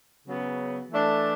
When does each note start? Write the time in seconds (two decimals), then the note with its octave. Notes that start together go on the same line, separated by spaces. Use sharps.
0.26 C#3 F#3 B3
0.91 E3 A3 D4